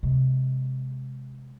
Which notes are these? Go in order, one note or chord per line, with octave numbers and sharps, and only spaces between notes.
C3 G#3